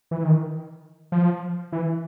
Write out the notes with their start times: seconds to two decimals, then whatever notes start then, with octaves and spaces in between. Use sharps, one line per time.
0.11 E3
0.23 D#3
1.12 F3
1.72 E3